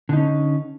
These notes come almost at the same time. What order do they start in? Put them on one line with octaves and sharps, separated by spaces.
D3 D#4 C#4